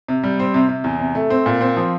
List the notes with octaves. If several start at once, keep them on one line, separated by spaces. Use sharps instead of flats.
C3
G3
C4
C3
C3
E2
C3
A3
C4
A#2
C4
F3